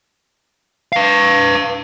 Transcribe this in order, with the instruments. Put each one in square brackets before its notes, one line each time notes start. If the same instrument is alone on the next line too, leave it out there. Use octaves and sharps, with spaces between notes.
[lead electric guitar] B4 F5